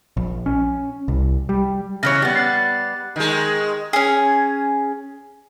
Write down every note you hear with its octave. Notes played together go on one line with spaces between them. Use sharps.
A#1
C#4
C2
G3
C#3 E3 C#5 A#6
G3 B3
F#6 A6 C7
D#3 G#3
C#4 G#4